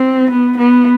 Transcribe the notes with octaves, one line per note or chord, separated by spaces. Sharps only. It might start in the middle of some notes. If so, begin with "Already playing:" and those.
Already playing: C4
B3
B3